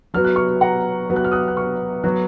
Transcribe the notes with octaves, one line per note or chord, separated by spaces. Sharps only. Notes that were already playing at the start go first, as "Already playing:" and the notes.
F#3 B3 F#4 F6
F#6
C#6 F6
F#5 A#5
F#3 B3 F#4
F#6
F6
D#6 F#6
F#6
C#6 F6
F#3 B3 F#4 F#6